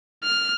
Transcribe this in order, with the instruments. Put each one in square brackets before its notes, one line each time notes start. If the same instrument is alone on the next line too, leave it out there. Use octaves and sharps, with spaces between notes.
[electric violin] F6